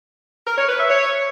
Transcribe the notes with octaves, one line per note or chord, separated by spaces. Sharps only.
A#4
C#5
B4
E5
C#5